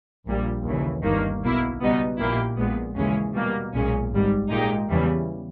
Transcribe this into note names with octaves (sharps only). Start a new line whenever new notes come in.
A#1 A#2 G3
D#2 C#3 E3
G1 G2 D#3 A#3
B1 B2 A#3 E4
C#2 B2 G3 B3 D#4
A#1 A#2 A#3 E4 G4
A#1 A#2 G#3 B3
D#2 C#3 E3 G#3 C#4
B2 G3 A#3
B1 A#2 G#3 C#4
G#1 G#2 G3
A#2 G#3 D#4 G4
E2 C#3 E3 G3